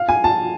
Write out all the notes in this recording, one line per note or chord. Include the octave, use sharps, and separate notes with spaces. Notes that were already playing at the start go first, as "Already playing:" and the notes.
Already playing: F5
G#5
A5